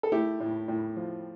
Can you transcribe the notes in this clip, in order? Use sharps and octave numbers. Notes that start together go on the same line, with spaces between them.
A4
A3 E4 G4
A2
A2
F3